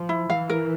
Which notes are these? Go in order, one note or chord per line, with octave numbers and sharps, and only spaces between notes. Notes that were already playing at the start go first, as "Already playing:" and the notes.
Already playing: F3
E4
E3 F5
A#4